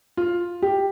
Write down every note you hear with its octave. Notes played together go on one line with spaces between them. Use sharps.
F4
G4